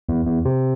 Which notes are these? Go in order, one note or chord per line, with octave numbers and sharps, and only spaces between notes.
E2
E2
C3